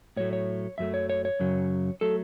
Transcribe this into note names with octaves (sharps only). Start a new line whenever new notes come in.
A2 F#3 A3 C#5
C#5
F#2 F#3 A3 E5
C#5
C#5
C#5
F#2 C#3 F#3
F#3 A3 A4